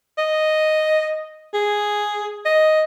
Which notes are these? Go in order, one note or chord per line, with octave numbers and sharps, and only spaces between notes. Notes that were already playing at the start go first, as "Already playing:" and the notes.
D#5
G#4
D#5